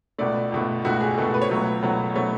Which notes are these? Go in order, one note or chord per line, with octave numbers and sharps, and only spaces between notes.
C#2 B2 A3 D5
C#2 B2 A3
C#2 B2 A3 F#4
G#4
C#2 B2 A3 A4
B4
C#5
C#2 B2 F#3 A3
C#2 B2 F#3 A3
B2 F#3 A3 C#5